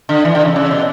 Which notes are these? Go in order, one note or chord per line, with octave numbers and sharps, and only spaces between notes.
D3
E3
D3
C#3
C#3
B2